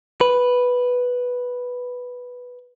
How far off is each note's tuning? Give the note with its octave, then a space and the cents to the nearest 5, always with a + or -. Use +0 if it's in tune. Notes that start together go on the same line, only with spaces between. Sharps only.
B4 +0